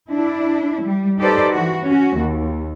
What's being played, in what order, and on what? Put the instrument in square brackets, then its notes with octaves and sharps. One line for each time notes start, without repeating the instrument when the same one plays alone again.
[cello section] D4 E4
G3
D#4 G4 A4 B4 C5 D5
E3 F#4
C#4 F#4
D#2